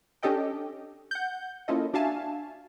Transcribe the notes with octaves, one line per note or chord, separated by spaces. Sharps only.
C#4 D4 G4 A4 D#5 G5
F#5 G6
A#3 C#4 E4 F4 A4 D#5
D4 F#4 E5 F5 G#5 A5